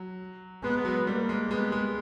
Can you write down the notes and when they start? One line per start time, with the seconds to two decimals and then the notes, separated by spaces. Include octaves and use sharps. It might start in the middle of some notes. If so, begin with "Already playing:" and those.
Already playing: F#3
0.63 G#3 B3
0.85 F#3
1.07 G3 A#3
1.29 G#3
1.50 G#3 B3
1.72 G#3